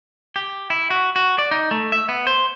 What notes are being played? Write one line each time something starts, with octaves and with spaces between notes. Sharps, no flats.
G4
E4
F#4
F#4
D5
D#4
A3
E5
B3
C5